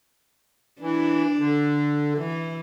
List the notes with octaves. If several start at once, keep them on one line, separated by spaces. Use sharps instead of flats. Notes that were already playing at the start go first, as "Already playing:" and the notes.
E3 D4
D3
E3